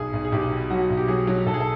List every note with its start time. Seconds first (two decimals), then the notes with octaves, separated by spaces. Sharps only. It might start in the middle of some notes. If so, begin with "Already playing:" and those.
Already playing: B1 G#4
0.13 B1
0.25 G#4
0.32 B1 G4
0.51 B2
0.70 F#3 F#4
0.90 B1
0.97 G4
1.08 F#3 G#4
1.27 F#3
1.46 B1 A4
1.54 G#4
1.60 A4